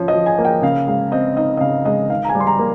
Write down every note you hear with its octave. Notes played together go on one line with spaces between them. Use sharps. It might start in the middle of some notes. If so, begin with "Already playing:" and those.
Already playing: F3 C#4
D#5
F3
G#5
A#3
G5
C#3 F5
G#3 F5
C4 D#5
D#4 D#5
D#5
C#3 F5
G#3 D#5
D#3 F5
A#5
G#5
G3
C6
A#5
A#3